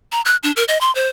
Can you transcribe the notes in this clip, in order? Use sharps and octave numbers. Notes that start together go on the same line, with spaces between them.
A#5
F#6
D4
A#4
D#5
C6
C5